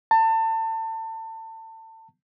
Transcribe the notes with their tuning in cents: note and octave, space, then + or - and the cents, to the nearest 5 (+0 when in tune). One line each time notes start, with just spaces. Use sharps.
A5 +30